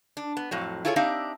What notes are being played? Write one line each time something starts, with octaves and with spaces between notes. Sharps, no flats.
D4
B3
F2 A2 F#3
E4 F4 G#4 A4 B4 C#5
C4 D4 D#4 G4 E5 F5